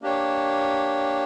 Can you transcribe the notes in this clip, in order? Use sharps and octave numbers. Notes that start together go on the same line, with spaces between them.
A#3 D4 G4 C#5